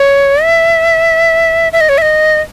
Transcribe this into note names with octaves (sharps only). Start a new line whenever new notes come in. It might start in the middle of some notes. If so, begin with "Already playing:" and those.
Already playing: C#5
E5
E5
D#5
C#5
E5
D#5